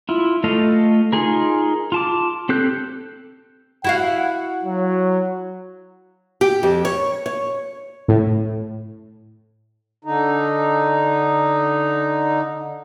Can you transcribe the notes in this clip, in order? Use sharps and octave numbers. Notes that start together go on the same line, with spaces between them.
E4 F4
A3 F4 A4 D#5 F5
D#4 F4 G#4 A#4
F4 A5 D6
C4 G4 A4 F#6 G6
E4 F#4 F5 F#5
F#3
G4
F2
C#5
C#5
A2
D3 D#4